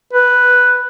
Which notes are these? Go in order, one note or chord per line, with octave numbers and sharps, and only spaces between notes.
B4